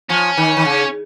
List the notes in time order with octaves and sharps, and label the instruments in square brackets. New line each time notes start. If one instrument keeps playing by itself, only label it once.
[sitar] F3 [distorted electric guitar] C#4
[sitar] D#3
D#3
C#3